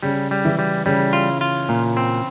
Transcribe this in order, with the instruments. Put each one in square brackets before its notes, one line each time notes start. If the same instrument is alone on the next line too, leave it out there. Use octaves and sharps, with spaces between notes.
[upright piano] C#3 C#4 [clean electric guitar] G3
[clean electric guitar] G3
[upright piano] E3 E4
[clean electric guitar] G3
[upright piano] C#3 C#4 [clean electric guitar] G3
[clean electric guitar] F4
F4
A#2
C4